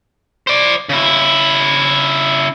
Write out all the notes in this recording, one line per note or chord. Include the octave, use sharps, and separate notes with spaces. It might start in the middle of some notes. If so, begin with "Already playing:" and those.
C5 D5
C#3 E4